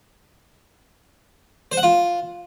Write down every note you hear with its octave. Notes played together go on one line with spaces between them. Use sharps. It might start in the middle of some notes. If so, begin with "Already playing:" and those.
C5
F#5
F4